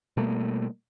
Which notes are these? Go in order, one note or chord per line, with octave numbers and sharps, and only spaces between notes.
B2 G3 A3 A#3